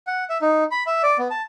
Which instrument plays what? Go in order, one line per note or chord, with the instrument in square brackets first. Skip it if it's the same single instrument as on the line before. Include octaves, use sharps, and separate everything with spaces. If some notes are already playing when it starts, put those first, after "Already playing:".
[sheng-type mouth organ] F#5
E5
D#4
B5
E5
D5
B3
A5